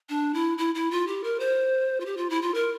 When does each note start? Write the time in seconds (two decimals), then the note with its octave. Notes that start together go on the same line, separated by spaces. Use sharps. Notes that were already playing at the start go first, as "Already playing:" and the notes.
0.09 D4
0.34 E4
0.58 E4
0.75 E4
0.91 F4
1.07 G4
1.24 A#4
1.40 C5
2.00 F4
2.06 G4
2.17 F4
2.30 E4
2.42 F4
2.54 A#4